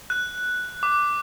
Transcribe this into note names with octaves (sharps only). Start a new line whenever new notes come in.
F#6
D6